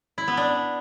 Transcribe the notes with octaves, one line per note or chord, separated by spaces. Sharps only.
E4
B3
D4